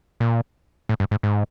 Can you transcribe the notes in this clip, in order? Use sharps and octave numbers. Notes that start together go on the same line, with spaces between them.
A#2
A2
G2
G#2
G#2